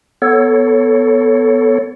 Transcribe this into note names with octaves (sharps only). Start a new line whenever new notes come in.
B3 A4 C#5